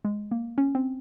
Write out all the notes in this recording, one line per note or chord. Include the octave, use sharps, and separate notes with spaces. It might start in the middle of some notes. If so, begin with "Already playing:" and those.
G#3
A#3
C#4
C4